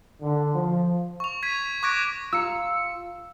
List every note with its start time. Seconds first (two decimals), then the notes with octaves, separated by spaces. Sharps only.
0.22 D3
0.55 F3
1.20 C#6 F7
1.43 G#6 B6 D#7
1.83 C#6 D6 F#6 G#6 A#6 D7
2.33 F4 A#5 E6 C#7